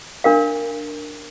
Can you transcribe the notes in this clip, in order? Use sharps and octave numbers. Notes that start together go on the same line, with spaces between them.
D4 A#4 F5